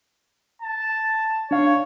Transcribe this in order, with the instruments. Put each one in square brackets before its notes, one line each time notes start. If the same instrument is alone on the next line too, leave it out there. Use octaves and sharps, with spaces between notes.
[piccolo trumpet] A5
[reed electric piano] D4 F5 [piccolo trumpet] C#5